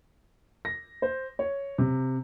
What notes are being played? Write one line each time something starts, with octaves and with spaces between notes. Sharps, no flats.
A#6
C5
C#5
C3